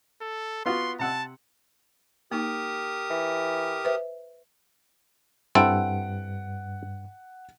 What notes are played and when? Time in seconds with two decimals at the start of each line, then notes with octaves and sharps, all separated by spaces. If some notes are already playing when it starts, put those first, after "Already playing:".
0.21 A4
0.66 B3 F4 F#4 C6
0.99 C3 F#5 A5 E6
2.32 A#3 D#4 G4 A#4 D#6
3.10 E3
3.85 B4 C5 E5
5.55 G2 C4 E4 A4 F#5 D7